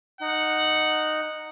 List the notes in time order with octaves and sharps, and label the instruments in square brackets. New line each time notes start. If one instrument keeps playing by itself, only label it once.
[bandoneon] D#4 [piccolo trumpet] F#5